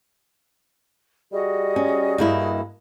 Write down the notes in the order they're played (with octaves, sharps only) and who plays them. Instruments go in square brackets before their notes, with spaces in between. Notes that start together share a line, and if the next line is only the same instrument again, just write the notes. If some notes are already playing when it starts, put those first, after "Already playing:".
[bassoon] G3 [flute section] F#4 G#4 D#5
[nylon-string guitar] C#4
G2 A#3 E4